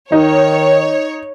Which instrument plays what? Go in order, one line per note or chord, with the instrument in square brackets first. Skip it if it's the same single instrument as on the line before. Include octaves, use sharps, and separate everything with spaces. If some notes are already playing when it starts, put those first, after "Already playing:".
[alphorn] D#3 [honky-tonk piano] D#4 [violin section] C#5